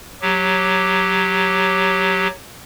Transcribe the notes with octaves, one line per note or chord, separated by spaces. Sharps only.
F#3 G4